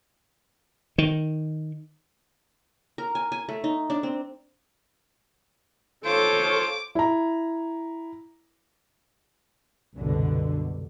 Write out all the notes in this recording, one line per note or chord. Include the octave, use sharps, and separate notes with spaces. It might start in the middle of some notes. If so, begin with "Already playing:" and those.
D#3
A#4
G#5
G#5
A3
D#4
D4
C4
F4 A4 C5 C#5 D6
E4 A#5
C2 F#2 B2 D3